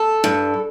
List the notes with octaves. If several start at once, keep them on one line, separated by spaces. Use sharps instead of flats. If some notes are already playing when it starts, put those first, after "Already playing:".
Already playing: A4
G2